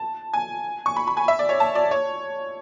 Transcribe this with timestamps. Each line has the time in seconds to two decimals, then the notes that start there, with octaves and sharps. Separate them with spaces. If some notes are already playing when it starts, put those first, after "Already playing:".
Already playing: A5
0.34 G#5
0.86 C#6
0.96 B5
1.07 B5
1.17 G#5
1.28 E5
1.39 D5
1.49 C#5
1.60 A5
1.75 D5
1.91 C#5